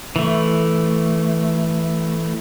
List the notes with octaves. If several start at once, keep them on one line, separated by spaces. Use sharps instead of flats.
E3 A3